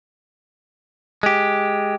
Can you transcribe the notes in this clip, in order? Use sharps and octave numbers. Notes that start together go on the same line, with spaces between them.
G#3 G4